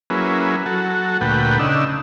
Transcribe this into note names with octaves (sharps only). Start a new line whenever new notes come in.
F#3 A#3 C#4 E4 G#4 B4
F#3 F#4 A4
D2 A#2 A3 B4 F#5 G5
C#3 D4 D#4 E6